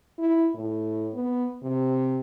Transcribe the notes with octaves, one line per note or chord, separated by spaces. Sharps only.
E4
A2
B3
C3